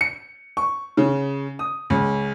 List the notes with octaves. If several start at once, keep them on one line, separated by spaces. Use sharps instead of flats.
C#7
C#6
C#3
D#6
C#2